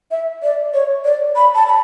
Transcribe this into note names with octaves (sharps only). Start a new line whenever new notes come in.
E5
D5
C#5
D5
B5
A5
B5